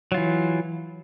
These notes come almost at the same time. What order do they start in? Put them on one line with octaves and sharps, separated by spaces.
F#3 F4 E3